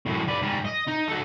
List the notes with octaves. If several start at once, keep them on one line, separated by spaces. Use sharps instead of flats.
F#2 A2
B4 D5
G#2 G3
D#5
D#4
F#4 A4